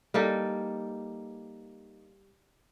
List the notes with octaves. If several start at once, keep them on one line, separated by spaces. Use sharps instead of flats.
G3 A#3 D#4 A4